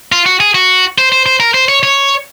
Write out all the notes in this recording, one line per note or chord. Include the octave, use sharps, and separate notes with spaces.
F4
F#4
G#4
F#4
C5
C5
C5
A#4
C5
C#5
C#5